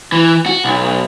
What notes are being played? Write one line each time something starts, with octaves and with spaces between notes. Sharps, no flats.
E3
F#4
B1